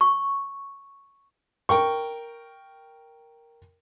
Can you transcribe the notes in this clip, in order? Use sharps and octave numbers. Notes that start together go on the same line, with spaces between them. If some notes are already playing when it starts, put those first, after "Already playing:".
C#6
A#4 G5 C#6